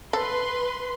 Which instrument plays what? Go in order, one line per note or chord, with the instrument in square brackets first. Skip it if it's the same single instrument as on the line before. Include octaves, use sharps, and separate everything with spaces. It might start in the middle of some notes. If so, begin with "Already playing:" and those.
[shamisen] A4 [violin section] B4 C6